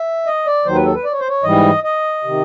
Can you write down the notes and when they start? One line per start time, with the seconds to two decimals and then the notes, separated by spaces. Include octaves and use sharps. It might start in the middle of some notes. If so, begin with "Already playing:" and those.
Already playing: E5
0.26 D#5
0.47 D5
0.65 D#2 D#3 F#3 C5
0.75 B4
0.85 A4
0.94 B4
1.04 D5
1.12 C#5
1.20 C5
1.29 C#5
1.43 G#2 E3 G3 D#5
1.84 D#5
2.24 C3 D#3